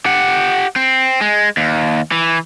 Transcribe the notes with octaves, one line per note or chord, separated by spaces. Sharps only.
G4 F#5
C4
G#3
D#2
E3